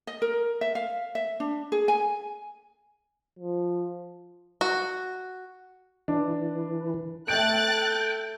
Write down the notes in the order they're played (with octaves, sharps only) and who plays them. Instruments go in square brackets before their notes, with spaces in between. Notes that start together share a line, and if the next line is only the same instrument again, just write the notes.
[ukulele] D#5
A#4
E5
F5
E5
D4
G#4
G#5
[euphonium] F3
[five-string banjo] F#4
[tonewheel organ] E3 [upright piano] D4
[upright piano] A3 G6 D7 [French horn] A4 [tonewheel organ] G5 [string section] F#6 A6